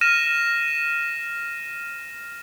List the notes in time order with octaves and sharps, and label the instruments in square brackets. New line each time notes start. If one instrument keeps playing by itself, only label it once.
[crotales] F6 A#6 D#7 E7